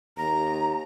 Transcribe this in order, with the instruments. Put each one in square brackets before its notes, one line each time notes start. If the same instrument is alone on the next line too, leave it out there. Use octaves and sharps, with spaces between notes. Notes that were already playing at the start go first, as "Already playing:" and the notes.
[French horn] D#2 [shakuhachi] A#5